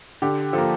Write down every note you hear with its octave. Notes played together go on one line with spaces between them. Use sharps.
D3 G4
F3 A#3 A4